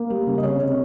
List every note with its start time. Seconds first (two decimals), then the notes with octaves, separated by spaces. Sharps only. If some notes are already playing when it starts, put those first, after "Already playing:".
Already playing: A#3
0.10 G3
0.27 C#3
0.38 D#5
0.43 C3 C#5
0.60 C3